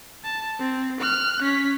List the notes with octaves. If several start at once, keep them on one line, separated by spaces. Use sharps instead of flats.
A5
C4
F6 F#6
C#4 B6